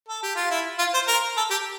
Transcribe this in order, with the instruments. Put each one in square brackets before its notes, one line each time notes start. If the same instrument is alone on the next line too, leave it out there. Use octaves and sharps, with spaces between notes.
[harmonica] A4
G4
F4
E4
F4
C5
A#4
A4
G4